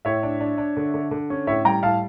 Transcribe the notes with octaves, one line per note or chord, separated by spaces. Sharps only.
A2 C#5 E5
D4
D4
D4
D3
D3
D3
C#4
A2 C#5 E5
G3 G5 A#5
A2 F5 A5